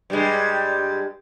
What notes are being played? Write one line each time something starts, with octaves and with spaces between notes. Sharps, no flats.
G2 G3 G#3